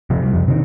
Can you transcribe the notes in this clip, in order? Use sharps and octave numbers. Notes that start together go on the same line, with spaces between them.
C3 F3
G3
F2 F3
C3 D#3